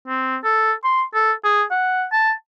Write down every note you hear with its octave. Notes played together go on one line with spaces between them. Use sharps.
C4
A4
C6
A4
G#4
F#5
A5